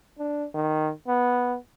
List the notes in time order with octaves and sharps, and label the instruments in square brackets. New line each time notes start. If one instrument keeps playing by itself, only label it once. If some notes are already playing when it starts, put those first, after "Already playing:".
[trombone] D4
D#3
B3